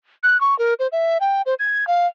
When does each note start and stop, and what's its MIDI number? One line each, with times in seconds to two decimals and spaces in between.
0.23 0.40 90
0.41 0.57 85
0.59 0.74 70
0.79 0.88 72
0.92 1.18 76
1.20 1.42 79
1.46 1.54 72
1.59 1.87 92
1.87 2.07 77